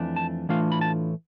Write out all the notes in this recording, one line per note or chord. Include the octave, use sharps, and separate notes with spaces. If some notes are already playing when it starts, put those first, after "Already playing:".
Already playing: F2 E3 A3 D4
A5
A2 E3 A3 D4 F4 F5
B5
A5